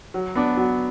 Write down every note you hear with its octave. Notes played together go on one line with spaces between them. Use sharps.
F#3
B3 D4
F#3